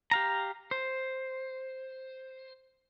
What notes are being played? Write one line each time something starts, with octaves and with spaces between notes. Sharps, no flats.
G4 F5 A#5
C5